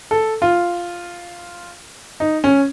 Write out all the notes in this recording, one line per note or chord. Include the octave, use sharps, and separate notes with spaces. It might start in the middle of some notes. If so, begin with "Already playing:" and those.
A4
F4
D#4
C#4